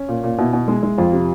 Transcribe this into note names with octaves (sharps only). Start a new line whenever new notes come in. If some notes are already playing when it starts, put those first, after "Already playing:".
Already playing: C#4
A#2
A#2
B2 E4
B2
G#3
G#3
F2 F4
C3